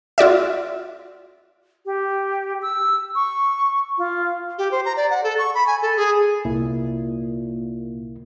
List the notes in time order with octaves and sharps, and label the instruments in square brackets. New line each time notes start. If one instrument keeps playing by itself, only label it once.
[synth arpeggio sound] F4 F#4 D5 E5
[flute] G4
E6
C#6
F4
[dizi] G4
C5
A#5
D5
F#5
A4
C#6
B5
G#5
A4
G#4
[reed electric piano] C2 A#3 E4 [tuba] A#2